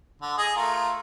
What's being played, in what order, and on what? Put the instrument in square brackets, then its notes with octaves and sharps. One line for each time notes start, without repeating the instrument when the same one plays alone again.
[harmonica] D3
G#4 D#5
A3 F4 A#4